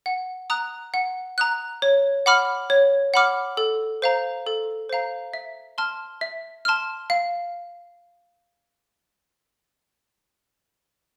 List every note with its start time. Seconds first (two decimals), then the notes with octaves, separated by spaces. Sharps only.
0.06 F#5
0.50 A#5 D#6 F#6
0.94 F#5
1.38 A#5 D#6 F#6
1.82 C#5
2.26 F#5 B5 D6 F6
2.70 C#5
3.14 F#5 B5 D6 F6
3.57 A4
4.02 C5 F5 A#5
4.46 A4
4.89 C5 F5 A#5
5.34 E5
5.78 A5 C6 F6
6.21 E5
6.65 A5 C6 F6
7.10 F5